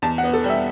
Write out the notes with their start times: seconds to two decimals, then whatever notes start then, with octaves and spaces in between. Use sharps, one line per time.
0.02 E2 A5
0.18 F#5
0.23 B3
0.33 A4
0.44 G3
0.50 E5